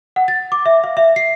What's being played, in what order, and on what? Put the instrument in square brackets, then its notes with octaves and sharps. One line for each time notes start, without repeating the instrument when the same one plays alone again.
[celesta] F#5
A6
D6
E5
F5
E5
C7